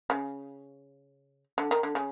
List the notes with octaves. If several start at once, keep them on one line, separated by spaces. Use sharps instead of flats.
C#3
D3
D#3
D3
C#3